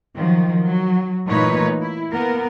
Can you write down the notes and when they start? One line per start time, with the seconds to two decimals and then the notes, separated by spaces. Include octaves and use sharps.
0.15 D#3 F3 F#3
0.61 F#3
1.27 A#2 E3 A3 D#4 B4 C#5
1.81 E4
2.12 A#3 B3 A#4